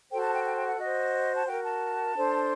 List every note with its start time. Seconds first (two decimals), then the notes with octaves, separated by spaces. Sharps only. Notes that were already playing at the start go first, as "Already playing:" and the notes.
0.10 F#4 A4 C5 G5
0.21 A5
0.33 G5
0.44 G5
0.55 G5
0.67 F#5
0.78 F#4 C5 D#5
1.35 A5
1.46 F#4 A#4 G5
1.64 A5
2.15 D4 A4 C5